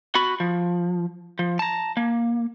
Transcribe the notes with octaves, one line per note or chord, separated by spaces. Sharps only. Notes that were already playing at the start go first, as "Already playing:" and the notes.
F#4 B5
F3
F3
A5 A#5
A#3